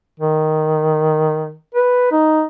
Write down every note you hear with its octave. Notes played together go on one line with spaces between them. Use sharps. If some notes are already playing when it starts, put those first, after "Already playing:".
D#3
B4
D#4